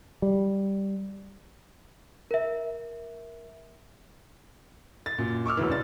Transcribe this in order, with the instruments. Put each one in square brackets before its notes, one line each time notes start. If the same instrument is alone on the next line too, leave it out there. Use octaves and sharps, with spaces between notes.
[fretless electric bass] G3
[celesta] A#4 E5
[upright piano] A6
F#2 A#2
C#6 D6 E6 F6
E1 D2 E3
C#2 D5 A6